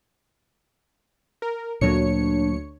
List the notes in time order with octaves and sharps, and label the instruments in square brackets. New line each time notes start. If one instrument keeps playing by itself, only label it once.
[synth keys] A#4
[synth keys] D2 C#5 C#7 [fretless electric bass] A#2 F#3 A#3 [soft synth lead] D4